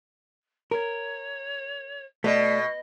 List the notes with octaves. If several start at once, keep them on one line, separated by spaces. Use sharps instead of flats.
A#4 C#5
B2 A3 D5 D#5